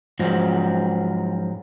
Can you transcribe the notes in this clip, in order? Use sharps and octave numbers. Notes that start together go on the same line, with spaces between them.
G#2 F3 F#3